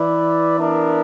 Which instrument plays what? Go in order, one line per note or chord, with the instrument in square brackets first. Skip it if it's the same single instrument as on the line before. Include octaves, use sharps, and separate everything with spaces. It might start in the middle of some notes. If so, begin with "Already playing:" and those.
Already playing: [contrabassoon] E3 [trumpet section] E4 B4 D5
[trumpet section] B3 D4 A#4 E5